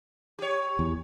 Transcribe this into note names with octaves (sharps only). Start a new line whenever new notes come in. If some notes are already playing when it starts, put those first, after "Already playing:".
G4 C#5
E2